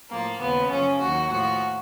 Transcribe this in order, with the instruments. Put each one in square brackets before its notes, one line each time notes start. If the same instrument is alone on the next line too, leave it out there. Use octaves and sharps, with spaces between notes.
[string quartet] A2 F3 A#3
D#2 C#3 F3 B3
F#2 C#3 F3 C#4
D#2 D#3 F#3 F#4
A2 F3 F#4